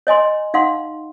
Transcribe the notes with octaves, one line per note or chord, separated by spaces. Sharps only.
C#5 D#5 G#5 C6
D#4 F5 F#5 C6